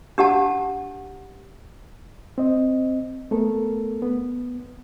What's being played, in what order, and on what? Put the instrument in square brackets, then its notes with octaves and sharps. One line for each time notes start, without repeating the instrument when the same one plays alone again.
[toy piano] D4 G4 F#5 A5
[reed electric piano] C4 D#5
A3 B3 A4 A#4
B3